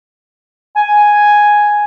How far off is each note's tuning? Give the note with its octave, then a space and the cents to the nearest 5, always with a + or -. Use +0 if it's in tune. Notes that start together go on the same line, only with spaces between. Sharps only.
G#5 +0